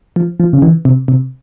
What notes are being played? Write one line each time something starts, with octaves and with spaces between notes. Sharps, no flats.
F3
F3
C#3
E3
C3
C3